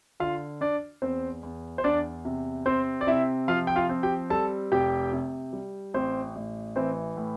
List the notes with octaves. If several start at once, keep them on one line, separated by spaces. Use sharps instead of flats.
D3 F4 F5
D4 D5
E2 C4 C5
E2
C5
E2 D4 D5
C3
C4 C5
D5
C3 E4 E5
F3 F4 F5
G5
F4 F5
C4
G4 G5
G3 A4 A5
F1 G4 G5
C3
G3
A1 C4 C5
A1
E3 C4 C5
A2